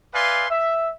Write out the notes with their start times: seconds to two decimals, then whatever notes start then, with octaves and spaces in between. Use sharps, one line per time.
0.15 B4 D5 E5 F5 G#5 C6
0.51 E5